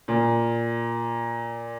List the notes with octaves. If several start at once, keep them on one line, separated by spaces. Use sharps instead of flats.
A#2